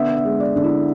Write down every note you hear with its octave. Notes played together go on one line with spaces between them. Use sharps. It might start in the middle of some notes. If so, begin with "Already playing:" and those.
Already playing: D3 B3 E5
E5
G#3
D5
D3
E4